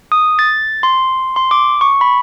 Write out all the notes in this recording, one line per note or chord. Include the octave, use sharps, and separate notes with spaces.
D#6
A6
C6
C6
D6
C#6
B5